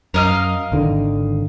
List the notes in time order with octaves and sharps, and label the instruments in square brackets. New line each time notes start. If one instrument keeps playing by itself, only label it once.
[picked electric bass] F#2 [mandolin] A#4 D#5 F5
[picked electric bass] G#1 D3 D#3